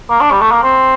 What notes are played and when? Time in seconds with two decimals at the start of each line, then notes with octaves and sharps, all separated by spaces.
0.10 A#3
0.21 D4
0.31 G3
0.41 A3
0.52 A#3
0.63 C4